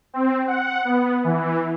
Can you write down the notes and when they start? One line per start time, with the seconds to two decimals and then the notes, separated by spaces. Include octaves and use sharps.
0.14 C4
0.47 F#5
0.85 B3
1.24 E3